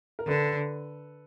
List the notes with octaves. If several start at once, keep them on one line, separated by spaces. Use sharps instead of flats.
A#4
D3 A4 B4